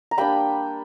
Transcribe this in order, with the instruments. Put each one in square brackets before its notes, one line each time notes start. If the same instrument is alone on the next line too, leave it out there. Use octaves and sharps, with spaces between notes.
[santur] A#5
G3 A#3 D4 G5 B5